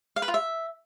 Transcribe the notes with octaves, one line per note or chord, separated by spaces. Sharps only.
F5
B4
F4
E5